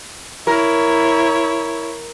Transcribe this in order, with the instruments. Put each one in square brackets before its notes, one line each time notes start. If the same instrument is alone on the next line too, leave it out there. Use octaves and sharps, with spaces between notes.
[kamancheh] E4 C#5 [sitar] A#4